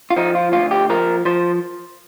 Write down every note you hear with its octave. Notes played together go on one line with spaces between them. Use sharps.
F4
F3 D#4
F4
D2 F4
G4
F3 A#4
F3 C5